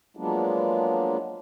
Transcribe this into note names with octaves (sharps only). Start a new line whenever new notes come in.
F3 F#3 G#3 A#3 B3 D4